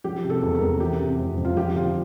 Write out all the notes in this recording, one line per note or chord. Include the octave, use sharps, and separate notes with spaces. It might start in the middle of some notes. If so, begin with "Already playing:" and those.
F3 G4
C3
A4
E2
A#4
E2
E3 G4
C3
F2
F2
F4
F3 G4
D3 F4